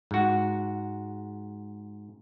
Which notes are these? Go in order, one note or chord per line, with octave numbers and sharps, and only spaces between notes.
G#2 F#4